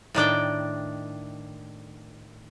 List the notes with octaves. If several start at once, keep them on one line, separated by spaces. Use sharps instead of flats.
A2 D#3 D4 G5